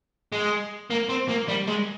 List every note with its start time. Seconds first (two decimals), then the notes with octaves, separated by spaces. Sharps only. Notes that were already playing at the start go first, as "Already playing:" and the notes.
0.32 G#3
0.91 A#3
1.10 C4
1.29 A#3
1.48 G3
1.67 G#3